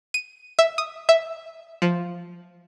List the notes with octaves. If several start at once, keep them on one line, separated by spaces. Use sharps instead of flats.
D#7
E5
D#6
E5
F3